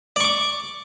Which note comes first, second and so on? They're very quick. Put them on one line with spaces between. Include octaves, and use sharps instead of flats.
D5 C#6 D6